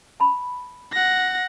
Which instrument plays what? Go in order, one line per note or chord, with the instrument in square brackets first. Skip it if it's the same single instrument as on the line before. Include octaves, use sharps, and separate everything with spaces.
[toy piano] A5 B5
[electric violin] F#5 A#6